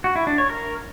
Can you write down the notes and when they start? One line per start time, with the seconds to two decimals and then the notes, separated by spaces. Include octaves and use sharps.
0.04 F#4
0.16 E4
0.27 D4
0.38 C#5
0.50 A#4